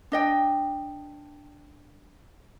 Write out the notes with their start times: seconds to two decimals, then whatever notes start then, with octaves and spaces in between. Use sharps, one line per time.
0.12 D4 D#5 G5